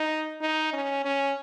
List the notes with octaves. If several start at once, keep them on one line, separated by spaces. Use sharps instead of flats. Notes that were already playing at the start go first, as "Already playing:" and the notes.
Already playing: D#4
D#4
C#4
C#4